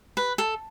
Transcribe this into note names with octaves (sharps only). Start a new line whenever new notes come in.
B4
A4